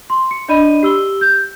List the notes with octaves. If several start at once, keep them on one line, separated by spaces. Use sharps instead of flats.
C6
C#7
D4 D5 D#5 B5 D#7
G4 E6 G7
G6